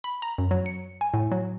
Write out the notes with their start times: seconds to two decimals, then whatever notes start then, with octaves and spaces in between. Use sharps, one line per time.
0.04 B5
0.22 A#5
0.38 F#2
0.51 F#3
0.66 C#7
1.01 G#5
1.14 A2
1.32 F#3